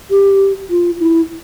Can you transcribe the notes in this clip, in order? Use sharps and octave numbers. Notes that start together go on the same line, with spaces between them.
G4
F4
E4